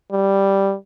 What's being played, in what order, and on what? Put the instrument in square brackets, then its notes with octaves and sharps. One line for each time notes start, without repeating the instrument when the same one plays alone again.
[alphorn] G3